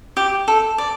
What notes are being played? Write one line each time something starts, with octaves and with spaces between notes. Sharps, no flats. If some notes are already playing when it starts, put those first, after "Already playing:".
G4
A4
D5